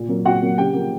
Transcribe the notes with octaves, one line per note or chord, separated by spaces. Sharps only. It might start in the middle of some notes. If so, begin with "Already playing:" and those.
Already playing: A#2
F#3 A#3
A#2 F#4 F#5
F#3 A#3
C#3 G4 G5
F3 A#3